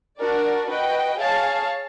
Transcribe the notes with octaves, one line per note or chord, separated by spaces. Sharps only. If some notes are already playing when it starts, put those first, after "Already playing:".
D4 F#4 A#4 D5
F#4 B4 D#5 G5
G#4 C#5 F5 A5